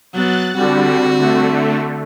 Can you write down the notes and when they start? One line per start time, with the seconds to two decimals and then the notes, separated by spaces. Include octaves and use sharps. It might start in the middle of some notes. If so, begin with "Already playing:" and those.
0.13 F#3 B3 F#6 A6
0.56 D3 G3 C4 F#4
1.18 D3 A3